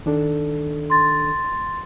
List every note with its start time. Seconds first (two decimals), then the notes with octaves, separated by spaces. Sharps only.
0.06 D#3 D4 A4
0.90 C6 A6